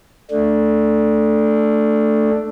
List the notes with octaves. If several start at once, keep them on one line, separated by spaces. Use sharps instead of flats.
A3 D4